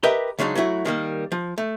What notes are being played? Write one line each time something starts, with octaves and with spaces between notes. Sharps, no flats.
G4 A#4 B4 D#5 E5 G5
C#3 F#3 G#3 D4 D#4
F#3 A3 E4 F#4
D#3 G3 A#3
F3
A3